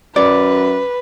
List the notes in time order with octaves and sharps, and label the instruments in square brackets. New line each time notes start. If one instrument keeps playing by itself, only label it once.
[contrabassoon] F#2 [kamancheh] B4 [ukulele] D5